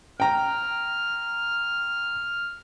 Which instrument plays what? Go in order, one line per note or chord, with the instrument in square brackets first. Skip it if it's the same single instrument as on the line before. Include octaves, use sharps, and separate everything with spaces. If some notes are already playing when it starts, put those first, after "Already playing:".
[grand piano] G5 A#5 [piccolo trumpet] F6